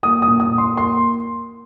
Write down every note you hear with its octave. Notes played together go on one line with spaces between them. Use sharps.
A#3 D#6
D#6
A#2
D#6
A#3
C6
A#3 C6